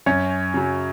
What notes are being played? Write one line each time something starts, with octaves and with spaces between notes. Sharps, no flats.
F#2 C#4 C#5
C#3 F#3